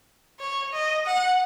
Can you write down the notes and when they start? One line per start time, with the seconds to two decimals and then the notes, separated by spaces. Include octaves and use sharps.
0.40 C#5
0.73 D#5
1.06 F#5